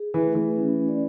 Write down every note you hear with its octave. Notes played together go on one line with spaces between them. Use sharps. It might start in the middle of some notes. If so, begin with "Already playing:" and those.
Already playing: G#4
E3
A3
E3
C#4
D5